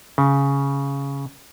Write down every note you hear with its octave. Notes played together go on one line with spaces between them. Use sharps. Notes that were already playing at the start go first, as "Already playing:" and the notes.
C#3